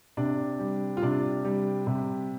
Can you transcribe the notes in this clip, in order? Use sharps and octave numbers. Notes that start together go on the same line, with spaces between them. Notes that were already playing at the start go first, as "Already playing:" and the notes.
C3 D4
G3
F4
C3 D4
G3
C3